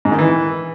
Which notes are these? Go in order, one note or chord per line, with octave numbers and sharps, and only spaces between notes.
G#2
D#3
E3